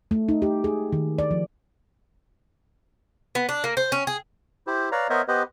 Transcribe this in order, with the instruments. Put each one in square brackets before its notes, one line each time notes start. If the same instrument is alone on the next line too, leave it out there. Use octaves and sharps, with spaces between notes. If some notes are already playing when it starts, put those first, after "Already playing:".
[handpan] A3
D#4
G4
G#4
D#3
D5
F3
[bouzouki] B3
D4
A#3
C5
C#4
G#4
[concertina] E4 G4 C5
B4 C#5 D5 F5 A#5
B3 A#4 C5 C#5 D#5 E5
B3 G4 B4 C5 D#5